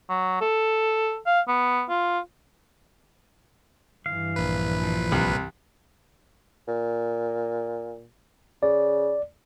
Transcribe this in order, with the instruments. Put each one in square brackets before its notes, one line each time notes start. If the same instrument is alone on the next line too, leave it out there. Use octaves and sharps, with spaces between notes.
[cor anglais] F#3
A4
F5
B3
F4
[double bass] G2 E3 [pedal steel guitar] F5
[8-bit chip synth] A#1 B4
[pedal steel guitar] F3
[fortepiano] C2
[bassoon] A#2
[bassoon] C#3 [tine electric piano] D5